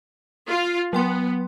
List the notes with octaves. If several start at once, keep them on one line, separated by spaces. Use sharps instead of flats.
F4 F5
F#3 B3 G5 C6